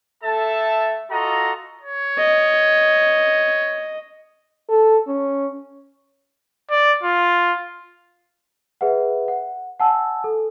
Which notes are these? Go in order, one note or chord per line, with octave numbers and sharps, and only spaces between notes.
A3 A4 E5 A5
F4 F#4 A4 D#5 A#5
C#5
D#5
A4
C#4
D5
F4
G#4 B4 E5 F#5
F#5
F#5 G#5 A5 E6
A4